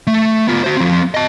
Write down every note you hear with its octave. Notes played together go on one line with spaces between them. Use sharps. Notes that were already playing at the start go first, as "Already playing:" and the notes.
A3
B3 F4
F#4 C5
F3 C4
D#5 A5